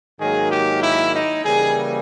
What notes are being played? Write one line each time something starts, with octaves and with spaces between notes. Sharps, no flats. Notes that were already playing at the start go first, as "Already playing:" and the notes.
G#2 D#3 F#3 A#3 G#4
G4
E4
D#4
C#3 E3 G3 A#3 G#4